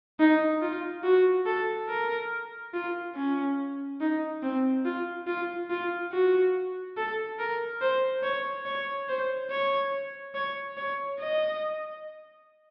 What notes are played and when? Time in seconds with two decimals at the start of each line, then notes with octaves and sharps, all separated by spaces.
0.19 D#4
0.62 F4
1.04 F#4
1.46 A4
1.89 A#4
2.74 F4
3.15 C#4
4.01 D#4
4.42 C4
4.85 F4
5.27 F4
5.70 F4
6.12 F#4
6.97 A4
7.39 A#4
7.81 C5
8.23 C#5
8.66 C#5
9.09 C5
9.50 C#5
10.35 C#5
10.77 C#5
11.20 D#5